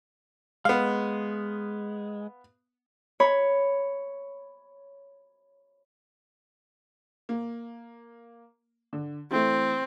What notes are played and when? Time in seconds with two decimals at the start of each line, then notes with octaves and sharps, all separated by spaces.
0.65 G#3 B3 F5
3.20 C#5 B5
7.29 A#3
8.93 D3
9.31 E3 A3 C4